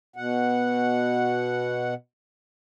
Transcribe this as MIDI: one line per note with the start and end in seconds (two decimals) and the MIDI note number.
0.16 1.94 47
0.16 1.94 78